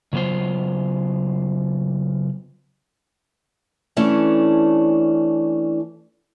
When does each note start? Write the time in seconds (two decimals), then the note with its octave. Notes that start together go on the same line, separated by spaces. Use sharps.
0.13 C#3 F#3 B3 F4 C5
3.97 E3 A3 C#4 D4